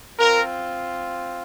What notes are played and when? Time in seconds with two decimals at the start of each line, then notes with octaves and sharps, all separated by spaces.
0.19 C4 F4 A#4